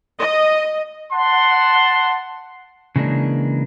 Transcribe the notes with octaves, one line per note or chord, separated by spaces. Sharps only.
D#5
F#5 A5 C6
C#3 E3 G#3 A#3 D4